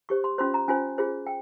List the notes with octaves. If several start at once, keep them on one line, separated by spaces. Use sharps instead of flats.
G4 C5 C#6
C6
C#4 F4 C5 C6
A#5
C#4 F4 C5 G#5
F4 G#4 C5
G5